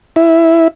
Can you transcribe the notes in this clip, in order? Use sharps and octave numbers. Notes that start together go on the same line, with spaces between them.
E4